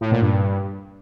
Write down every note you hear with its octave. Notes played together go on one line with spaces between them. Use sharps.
A2
A#2
G2